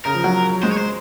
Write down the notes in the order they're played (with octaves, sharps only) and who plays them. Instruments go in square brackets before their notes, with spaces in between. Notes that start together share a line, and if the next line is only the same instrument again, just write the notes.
[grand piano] C#3 [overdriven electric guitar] A#4
[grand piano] F3
F#3
[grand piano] G#3 [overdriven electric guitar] C5
[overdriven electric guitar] C#5
C5